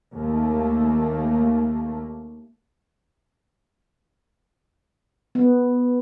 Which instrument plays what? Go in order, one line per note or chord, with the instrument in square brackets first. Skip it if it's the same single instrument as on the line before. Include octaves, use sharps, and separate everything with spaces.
[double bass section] D#2 A3 A#3
[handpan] B3